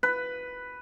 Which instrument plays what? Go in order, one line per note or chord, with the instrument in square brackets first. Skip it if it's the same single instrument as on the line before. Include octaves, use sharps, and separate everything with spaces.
[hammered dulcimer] B4